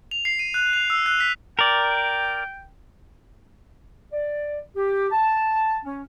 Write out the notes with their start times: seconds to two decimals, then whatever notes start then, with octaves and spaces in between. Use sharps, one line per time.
0.11 F7
0.25 C7
0.39 D#7
0.54 F#6
0.73 F7
0.90 E6
1.06 F#6
1.20 B6
1.59 A#4 D5 G5
4.13 D5
4.76 G4
5.11 A5
5.85 C#4